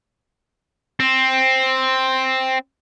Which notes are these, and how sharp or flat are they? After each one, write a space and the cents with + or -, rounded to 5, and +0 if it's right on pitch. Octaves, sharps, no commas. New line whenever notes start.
C4 +5